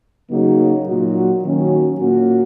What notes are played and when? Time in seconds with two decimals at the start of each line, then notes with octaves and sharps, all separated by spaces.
0.30 C#3 F#3 A#3 D#4 F#4
0.86 A#2 F#3 D#4 F#4
1.43 D#3 F#3 A#3 C#4 F#4
1.98 A#2 A#3 C#4 F#4